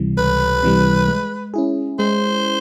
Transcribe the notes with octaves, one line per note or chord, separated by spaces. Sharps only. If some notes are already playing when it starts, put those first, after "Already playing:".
Already playing: C#2 C3 E3 G3
C#2 B4
C3 E3 G3
G#3
C#4 E4 G#4
G#3 C5